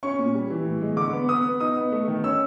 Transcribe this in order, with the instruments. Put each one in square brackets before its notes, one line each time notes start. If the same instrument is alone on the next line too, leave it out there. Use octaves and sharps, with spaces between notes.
[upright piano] C#4 C#6
A#2
G3
E3
A2
G#3
D3 D6
B3
B3 D#6
B3
D#4 D#6
B3
A3
D#3
C#4 E6